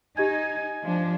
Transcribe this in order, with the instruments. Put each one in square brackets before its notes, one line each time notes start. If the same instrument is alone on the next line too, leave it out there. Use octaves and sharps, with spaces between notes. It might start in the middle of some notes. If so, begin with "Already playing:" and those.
[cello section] D#4 [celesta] G4 D#5 G#6 [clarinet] G#5
[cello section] F3 D4